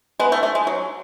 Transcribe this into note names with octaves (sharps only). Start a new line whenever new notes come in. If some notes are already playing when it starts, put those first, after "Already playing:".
G#3 B3
A3
A3
G#3
F#3